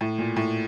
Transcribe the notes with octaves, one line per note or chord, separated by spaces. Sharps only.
A2
A#2
A2